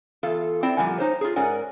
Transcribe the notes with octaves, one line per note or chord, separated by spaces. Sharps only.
E2 F4 A4 F5
C4 E4 D5 G5
A#2 F3 G3 G4 F#5 G#5
D#4 C5 C#5
F4 G#4
G#2 C#4 A#4 D5 F#5 G#5